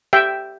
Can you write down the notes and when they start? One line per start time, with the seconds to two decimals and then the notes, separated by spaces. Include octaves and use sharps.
0.13 G4 E5 G5